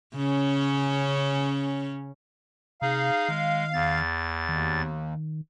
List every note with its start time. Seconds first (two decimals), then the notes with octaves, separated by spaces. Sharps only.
0.15 C#3 C#4
2.82 C3 D#4 G#4 F5
3.28 D#3 G#3
3.73 E2 A6
4.49 D#2 D#3